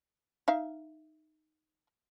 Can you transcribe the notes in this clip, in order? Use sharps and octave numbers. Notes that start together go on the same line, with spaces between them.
D#4 E5 F5